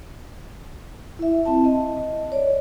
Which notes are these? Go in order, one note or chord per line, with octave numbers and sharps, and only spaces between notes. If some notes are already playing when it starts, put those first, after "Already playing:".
E4 E5
C4 E4 A5
D#5
C#5 D5